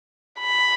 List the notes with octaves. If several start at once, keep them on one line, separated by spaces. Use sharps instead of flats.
B5